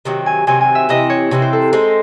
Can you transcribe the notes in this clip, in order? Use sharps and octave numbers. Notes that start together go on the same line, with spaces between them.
C3 D#3 F#3 C4
G#5
C3 D#3 F#3 C4 G#5
G#5
E5
C3 E3 C4 E4 D#5
C#5
C3 E3 C4 E4
C5
A4
G#3 C4 D#4 C5